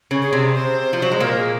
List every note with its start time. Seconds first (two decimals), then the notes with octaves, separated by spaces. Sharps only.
0.11 C#3 C#4
0.22 G#4
0.33 C3 C4
0.55 C5
0.93 F3
1.02 F#3
1.12 G#3
1.20 A#2 A#3 A#4
1.37 G#4